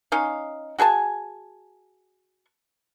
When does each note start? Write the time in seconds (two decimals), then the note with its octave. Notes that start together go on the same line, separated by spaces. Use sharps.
0.12 C#4 D#4 F5
0.79 F#4 G#4 G#5 A5